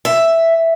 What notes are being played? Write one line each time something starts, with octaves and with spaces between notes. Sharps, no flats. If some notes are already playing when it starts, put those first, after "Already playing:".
E5